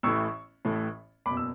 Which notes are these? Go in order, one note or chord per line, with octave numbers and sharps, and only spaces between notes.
A1 A2 E3 A3 C#6 E6
A1 A2 E3 A3
F#1 E2 B2 B5 D6
E6